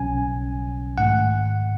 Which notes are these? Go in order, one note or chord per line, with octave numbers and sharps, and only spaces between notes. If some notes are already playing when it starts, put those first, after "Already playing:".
Already playing: B1 B2 F#3 C#4 G#5
G#2 D#3 A3 F#5